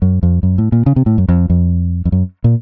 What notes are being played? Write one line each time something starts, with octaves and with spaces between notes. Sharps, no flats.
F#2
F2
F#2
A2
A#2
C#3
C3
A2
F#2
F2
F2
F2
F#2
A#2